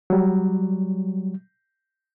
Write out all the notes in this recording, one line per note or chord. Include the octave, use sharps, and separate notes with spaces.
F#3 G3